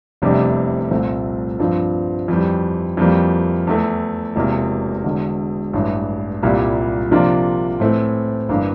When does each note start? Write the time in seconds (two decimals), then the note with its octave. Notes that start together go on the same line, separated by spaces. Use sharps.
0.22 F1 E2 C3 G3 D4
0.91 C2 A#2 A3 C4
1.59 G2 F3 C4 F4
2.28 F2 E3 G3
2.97 F2 E3 G3 A#3
3.67 E2 E3 A3
4.36 E1 E2 C3 E3 A#3
5.04 E1 E2 D3
5.73 A1 G2 E3
6.43 C2 A#2 G3 A#3 E4
7.11 C3 F3 A#3 D4 F4
7.80 A2 E3 A3 C4
8.49 G1 G2 E3 A#3